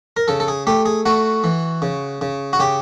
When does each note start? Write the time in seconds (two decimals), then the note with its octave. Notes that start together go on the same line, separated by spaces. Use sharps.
0.17 A#4
0.28 C#3 A4
0.40 A4
0.48 G#4
0.67 A3 G4
0.86 G#4
1.06 A3 F#4
1.44 E3
1.82 C#3
2.21 C#3
2.53 F#4
2.59 C#3 G4